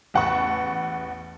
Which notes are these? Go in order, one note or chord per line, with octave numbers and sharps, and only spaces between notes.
A1 E2 F#5 A5 B5 C#6